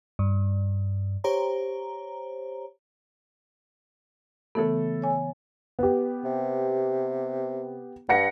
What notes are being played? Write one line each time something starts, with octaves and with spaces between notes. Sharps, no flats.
G2
G4 C5 C#5 A#5
C#3 E3 A3 B3 A4
C#5 G#5
B3 G4
C3
G2 F#5 A#6 C#7